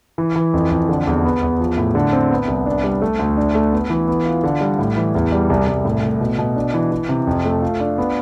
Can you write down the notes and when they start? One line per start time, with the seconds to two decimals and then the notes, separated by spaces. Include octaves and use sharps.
0.18 E3
0.36 E3
0.53 F2
0.71 F2
0.89 D3
1.07 E2
1.25 B3
1.43 E2
1.59 F3
1.78 A2
1.95 D3
2.13 C4
2.31 B3
2.48 C2
2.66 D4
2.84 G3
3.02 A3
3.19 D2
3.37 D4
3.55 A3
3.73 B3
3.90 E3
4.08 B3
4.26 F4
4.44 D3
4.61 G3
4.79 A2
4.97 E3
5.15 E2
5.32 G3
5.50 C2
5.67 C2
5.85 A2
6.03 A2
6.21 B2
6.38 B2
6.56 D4
6.74 E3
6.92 E3
7.09 C3
7.27 F2
7.45 A3
7.62 F4
7.80 D4
7.98 B3